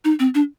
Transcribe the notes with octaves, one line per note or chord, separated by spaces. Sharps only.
D#4
C4
D4